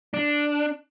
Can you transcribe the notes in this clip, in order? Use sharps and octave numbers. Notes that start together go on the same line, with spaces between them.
D4